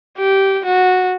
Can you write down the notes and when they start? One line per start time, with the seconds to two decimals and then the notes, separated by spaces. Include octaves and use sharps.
0.19 G4
0.65 F#4